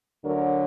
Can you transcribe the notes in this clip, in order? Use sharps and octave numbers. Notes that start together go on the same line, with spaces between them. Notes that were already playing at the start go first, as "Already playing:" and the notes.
D2 D3 F#3 A#4